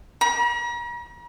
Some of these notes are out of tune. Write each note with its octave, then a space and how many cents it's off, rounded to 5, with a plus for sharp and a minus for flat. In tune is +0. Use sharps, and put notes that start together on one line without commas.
A#5 +45